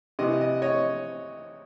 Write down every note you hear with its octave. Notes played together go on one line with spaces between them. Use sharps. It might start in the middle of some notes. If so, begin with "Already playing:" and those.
C3 E3 D#5
D#5
C#5 D#5